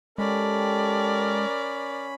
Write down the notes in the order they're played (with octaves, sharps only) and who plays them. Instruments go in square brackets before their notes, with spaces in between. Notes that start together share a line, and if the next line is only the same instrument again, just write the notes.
[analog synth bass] G#3 [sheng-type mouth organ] C#4 B5 [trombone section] G4 A4 [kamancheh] A#4 D5